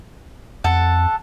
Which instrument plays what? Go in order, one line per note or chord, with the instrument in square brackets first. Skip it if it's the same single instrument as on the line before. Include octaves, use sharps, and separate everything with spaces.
[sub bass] F2 [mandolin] A4 F#5